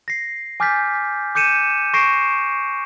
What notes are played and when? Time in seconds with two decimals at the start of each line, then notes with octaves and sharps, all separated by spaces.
0.08 A#6 C7
0.60 G#5 D6 F6 G6 A6 B6
1.35 D6 G6 C#7 D#7 E7
1.94 C#6 A#6 C7 D7 E7